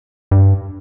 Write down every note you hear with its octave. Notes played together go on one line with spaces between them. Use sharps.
G2